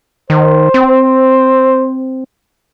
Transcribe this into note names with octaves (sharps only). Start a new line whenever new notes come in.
D#3 C5
C4